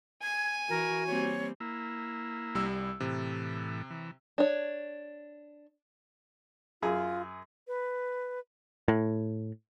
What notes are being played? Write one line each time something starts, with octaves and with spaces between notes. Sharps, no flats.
G#5 G#6
E3 F#4 A#4
G3 A#3 C4 C#5
A#3 E4
C2 G3 E6
A2 C3 E3
E3
D4 C#5
F#2 F4 G#4
B4
A2